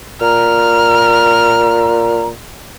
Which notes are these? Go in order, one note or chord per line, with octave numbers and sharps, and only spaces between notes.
A#2 A#5 F6